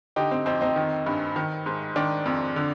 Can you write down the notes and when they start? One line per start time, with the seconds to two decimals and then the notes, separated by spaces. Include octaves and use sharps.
0.16 D3 D#4 G4
0.31 C4
0.46 F2 C4 D#4
0.61 C4 D#4
0.76 D#3
1.06 G2
1.36 D#3
1.66 G#2
1.96 D#3 D4
2.26 F2
2.56 D3